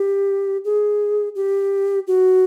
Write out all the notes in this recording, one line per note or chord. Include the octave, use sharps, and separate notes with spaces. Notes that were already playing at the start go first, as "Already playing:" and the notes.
Already playing: G4
G#4
G4
F#4